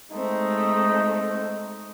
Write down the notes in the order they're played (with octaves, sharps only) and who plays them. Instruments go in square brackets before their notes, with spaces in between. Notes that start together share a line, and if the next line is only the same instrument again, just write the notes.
[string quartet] G#3 A3 C4 [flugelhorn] D#4